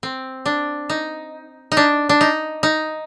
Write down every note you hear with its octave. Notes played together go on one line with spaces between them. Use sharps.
C4
D4
D#4
D#4
D4
D4
D#4
D#4